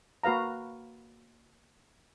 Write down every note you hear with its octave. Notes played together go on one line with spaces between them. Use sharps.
A#3 F#4 B4 F5 A#5